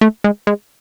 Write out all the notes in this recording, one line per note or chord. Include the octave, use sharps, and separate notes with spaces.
A3
G#3
G#3